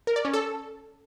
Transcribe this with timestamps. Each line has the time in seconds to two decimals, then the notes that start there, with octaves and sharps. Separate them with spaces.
0.07 A#4
0.16 D5
0.25 C#4
0.33 A4